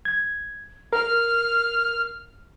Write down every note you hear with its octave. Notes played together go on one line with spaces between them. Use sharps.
G#6
A#4 F6